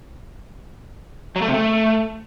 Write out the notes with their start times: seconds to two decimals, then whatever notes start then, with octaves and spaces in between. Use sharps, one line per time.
1.36 F#3
1.42 A3
1.48 C3
1.54 A3